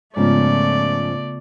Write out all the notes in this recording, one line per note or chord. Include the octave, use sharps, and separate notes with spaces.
G#2 C#3 F3 A3 B3 C#4 F4 D5